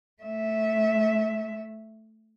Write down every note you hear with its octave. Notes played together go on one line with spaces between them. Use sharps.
A3 E5